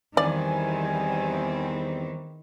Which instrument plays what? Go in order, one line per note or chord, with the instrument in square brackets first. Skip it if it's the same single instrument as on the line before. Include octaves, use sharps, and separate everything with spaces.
[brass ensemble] E2 G3 C4 [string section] D#3 E3 [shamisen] D5 [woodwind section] G#5